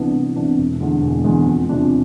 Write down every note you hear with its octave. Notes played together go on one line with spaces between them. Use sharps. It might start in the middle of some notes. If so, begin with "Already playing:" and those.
Already playing: C2 C3 E3 B3 D4
C2
C3 E3 B3 D4
E1
E2 D3 G#3
E1
E2 D3 G#3
F2
C3 F3 G#3 D4